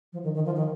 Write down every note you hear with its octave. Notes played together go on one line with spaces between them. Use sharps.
F3
D#3
D#3
F3
D#3